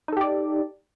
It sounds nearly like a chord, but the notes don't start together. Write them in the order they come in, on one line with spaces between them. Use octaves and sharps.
D#4 A4 G4 D5